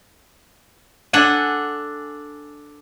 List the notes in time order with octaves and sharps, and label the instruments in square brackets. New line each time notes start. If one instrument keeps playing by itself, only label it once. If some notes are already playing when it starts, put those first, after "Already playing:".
[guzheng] D4 A4 F#5 G#5